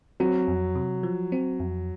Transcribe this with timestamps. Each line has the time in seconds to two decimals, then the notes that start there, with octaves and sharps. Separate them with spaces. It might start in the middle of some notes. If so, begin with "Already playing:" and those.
0.20 F#3 C4
0.48 F2
0.75 C3
1.03 F3
1.32 C4
1.60 F2